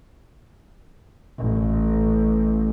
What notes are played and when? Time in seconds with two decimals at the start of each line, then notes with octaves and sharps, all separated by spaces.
1.38 A1